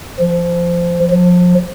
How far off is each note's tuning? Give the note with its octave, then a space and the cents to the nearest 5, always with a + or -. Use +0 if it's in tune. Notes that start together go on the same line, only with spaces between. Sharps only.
F3 -15
F3 +30